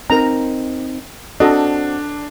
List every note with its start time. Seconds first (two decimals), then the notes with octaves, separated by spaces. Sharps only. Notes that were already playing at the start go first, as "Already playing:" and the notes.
0.10 C4 D#4 A#4 A#5
1.40 C4 D4 F#4 A4 D#5